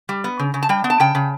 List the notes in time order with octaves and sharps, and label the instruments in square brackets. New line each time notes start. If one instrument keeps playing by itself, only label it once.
[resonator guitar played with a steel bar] G3
B3
C#3
C#3
A5
G3 G5
B3
A5
C#3 G5
C#3